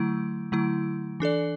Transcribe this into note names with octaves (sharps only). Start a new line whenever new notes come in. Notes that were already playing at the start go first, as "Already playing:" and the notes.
Already playing: D3 F#3 A3 E4
D3 F#3 A3 E4
E3 D4 A4 D5